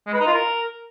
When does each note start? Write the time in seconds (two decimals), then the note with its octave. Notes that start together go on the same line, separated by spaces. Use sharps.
0.07 G#3
0.13 B4
0.20 D#4
0.27 F4
0.33 A#4